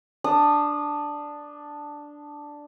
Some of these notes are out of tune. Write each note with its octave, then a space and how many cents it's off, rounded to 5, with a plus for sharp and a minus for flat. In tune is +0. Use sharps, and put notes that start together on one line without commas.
D4 +0 D#6 -20